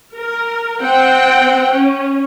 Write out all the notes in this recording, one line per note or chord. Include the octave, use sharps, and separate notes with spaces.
A#4
C4 F#5 G5
C#4